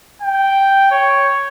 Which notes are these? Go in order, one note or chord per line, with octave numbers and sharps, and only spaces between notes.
G5
C#5